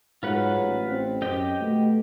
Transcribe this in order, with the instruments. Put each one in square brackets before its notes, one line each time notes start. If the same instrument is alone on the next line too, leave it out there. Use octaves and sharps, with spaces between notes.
[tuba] G#2 [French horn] F#3 [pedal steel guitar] F4 B4 F#5
[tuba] A1
[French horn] C4
[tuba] F#2 [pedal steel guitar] G4 D#5 G5
[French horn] B2 [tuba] A3